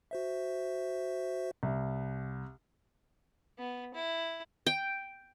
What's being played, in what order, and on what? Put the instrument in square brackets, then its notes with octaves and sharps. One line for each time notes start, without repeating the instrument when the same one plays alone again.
[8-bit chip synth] F#4 C5 E5
[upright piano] C2
[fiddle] B3
E4
[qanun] G5